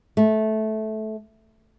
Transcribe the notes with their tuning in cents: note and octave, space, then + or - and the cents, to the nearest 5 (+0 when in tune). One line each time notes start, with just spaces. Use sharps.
A3 -15